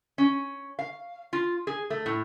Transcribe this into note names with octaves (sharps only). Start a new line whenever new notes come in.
C#4
F5
F4
G#4
A3
A2